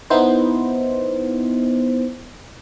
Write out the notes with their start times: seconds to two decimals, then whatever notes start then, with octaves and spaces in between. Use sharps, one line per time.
0.10 B3 D#4 E4 C5